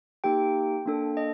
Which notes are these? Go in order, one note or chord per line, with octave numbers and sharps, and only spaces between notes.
A#3 D#4 G4 G5
A#3 D4 A4
D#5